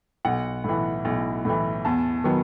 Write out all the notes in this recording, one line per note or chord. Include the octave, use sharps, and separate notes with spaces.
B1 F#5
A2 E3
B1
A2 E3
E2 A5
D#3 F#3 B3